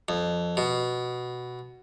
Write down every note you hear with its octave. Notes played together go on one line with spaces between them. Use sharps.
F2
B2